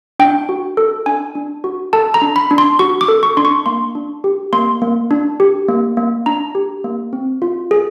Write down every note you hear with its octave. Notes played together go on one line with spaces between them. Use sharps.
D4 G5
F#4
A4
D4 G#5
D4
F#4
A4 A5
A#5
D4
B5
D4
C6
F#4 C#6
D6
A4
C#6
D4 C6
C#6
A#3 C6
D4
G4
A#3 C6
A#3
D4
G4
A#3
A#3
D4 A#5
G4
A#3
C4
F4
G#4